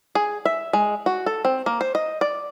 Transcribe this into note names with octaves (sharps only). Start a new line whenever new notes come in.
G#4
E5
G#3
F#4
A4
C4
A#3
C5
D#5
D5